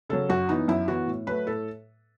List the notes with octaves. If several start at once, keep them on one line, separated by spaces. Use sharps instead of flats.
C#3 F#3 A4
F#2 F#4
E3 B3 D#4
F#2 E4
E3 B3 F#4
A2
F#3 A3 B4
A2 A4